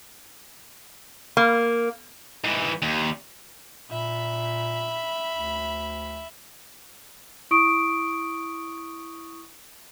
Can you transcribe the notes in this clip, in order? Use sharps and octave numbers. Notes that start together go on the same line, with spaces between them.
A#3
G#2 E3
D#2
A#2 E5 B5
D2
E4 C#6 D#6 D7